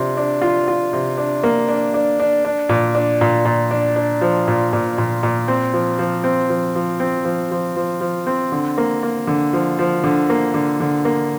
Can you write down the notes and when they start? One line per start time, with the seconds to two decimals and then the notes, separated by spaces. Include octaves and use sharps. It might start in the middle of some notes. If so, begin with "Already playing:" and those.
Already playing: C3 D4 F4
0.17 D4
0.42 F4
0.68 F4
0.93 C3
1.18 D4
1.43 A#3
1.69 D4
1.94 D4
2.20 D4
2.45 D4
2.69 A#2
2.95 D4
3.21 A#2
3.45 A#2
3.71 D4
3.96 D4
4.21 F3
4.48 A#2
4.73 A#2
4.98 A#2
5.23 A#2
5.48 C4
5.73 F3
5.99 F3
6.24 C4
6.50 F3
6.75 F3
7.00 C4
7.25 F3
7.51 F3
7.76 F3
8.01 F3
8.27 C4
8.52 D3
8.78 A#3
9.03 A#3
9.27 D3
9.53 F3
9.79 F3
10.04 D3
10.30 A#3
10.54 D3
10.80 D3
11.05 A#3